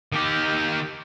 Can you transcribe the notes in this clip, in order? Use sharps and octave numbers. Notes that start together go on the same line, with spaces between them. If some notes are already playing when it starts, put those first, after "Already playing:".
D#3 G4